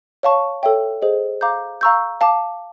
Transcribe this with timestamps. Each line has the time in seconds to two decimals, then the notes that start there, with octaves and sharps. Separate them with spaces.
0.23 C#5 F5 A5 C#6
0.63 A4 C#5 E5 G5
1.02 G#4 C5 D#5
1.41 F5 A#5 D6 G6
1.81 F5 A#5 C#6 E6 G6
2.21 F5 A5 D6